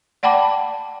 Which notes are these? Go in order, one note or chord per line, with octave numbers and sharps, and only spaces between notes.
D5 F#5 G5 A5 B5 D6